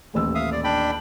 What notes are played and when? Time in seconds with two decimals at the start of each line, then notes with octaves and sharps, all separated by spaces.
0.14 D#1 A1 E6
0.35 E5 F5 D#6
0.52 D5
0.64 D4 G5 B5